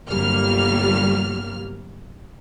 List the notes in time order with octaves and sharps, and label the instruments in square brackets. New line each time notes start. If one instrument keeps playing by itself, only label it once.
[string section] G1 C2 F#3 G3 A#3 F6